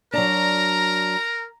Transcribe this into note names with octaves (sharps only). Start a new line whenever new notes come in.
F#3 D4 A#4 A#5